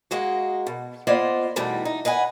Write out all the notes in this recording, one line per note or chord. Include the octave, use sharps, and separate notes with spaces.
G#3 A#3 F#4
B2
A#3 B3 F4 C5 D5 D#5
E2 B2 G3 A3 D#4
D#4
B4 D#5 F#5 G#5